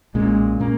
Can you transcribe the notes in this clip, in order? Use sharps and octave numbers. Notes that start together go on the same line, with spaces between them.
B1 A#2 G#3 A#3 C#4
A#2 A#3 C#4